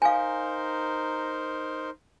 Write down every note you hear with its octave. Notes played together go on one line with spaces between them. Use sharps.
D#4 A#4 C5 F5 G#5